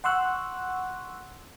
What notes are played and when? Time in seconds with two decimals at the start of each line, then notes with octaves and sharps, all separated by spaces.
0.04 F#5 C6 C#6 E6 F#6